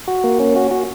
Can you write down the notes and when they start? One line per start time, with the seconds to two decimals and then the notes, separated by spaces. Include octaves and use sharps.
0.08 F#4
0.24 A#3
0.40 C#4
0.56 F#4
0.71 F#4